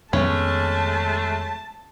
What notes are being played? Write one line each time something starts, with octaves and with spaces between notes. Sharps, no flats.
F2 D#3 G#3 A3 B3 C#4 A5